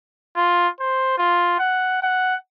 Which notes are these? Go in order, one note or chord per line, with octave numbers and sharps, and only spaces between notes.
F4
C5
F4
F#5
F#5